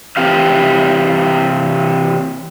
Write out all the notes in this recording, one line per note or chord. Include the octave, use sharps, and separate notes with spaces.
C3 E3 C4 G4 F5